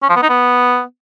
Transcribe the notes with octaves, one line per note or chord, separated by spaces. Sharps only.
C#4
F3
B3
D#4
B3